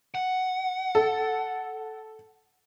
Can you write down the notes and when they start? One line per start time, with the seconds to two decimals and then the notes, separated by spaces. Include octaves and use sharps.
0.15 F#5
0.95 A4